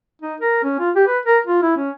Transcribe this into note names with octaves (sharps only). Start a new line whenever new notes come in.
D#4
A#4
C#4
F4
G4
B4
A#4
F4
E4
C#4